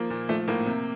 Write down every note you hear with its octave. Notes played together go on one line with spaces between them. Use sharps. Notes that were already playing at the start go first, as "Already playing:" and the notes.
Already playing: F3 A#3
A#2
F3 A3
A2 A#3
C3